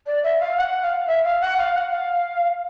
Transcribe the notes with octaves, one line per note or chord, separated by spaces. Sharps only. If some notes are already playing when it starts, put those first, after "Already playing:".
D5
E5
F5
F#5
F5
E5
F5
F#5
F5
F#5
F5